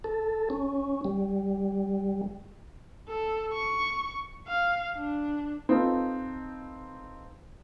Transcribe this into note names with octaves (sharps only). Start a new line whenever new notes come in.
A4
C#4
G3
A4
C#6
F5
D4
C4 D#4 F4 A4 B4